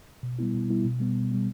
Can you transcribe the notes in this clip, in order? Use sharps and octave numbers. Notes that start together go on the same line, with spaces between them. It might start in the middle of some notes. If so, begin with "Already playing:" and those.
B2
G3 B3 E4
B2
G3 B3 E4
B2
G3 B3
B2
G3 B3